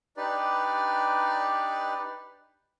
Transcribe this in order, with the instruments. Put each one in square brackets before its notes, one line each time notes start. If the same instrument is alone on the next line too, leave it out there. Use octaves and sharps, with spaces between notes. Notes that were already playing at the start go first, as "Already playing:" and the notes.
[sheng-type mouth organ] D4 D#4 G4 B4 D5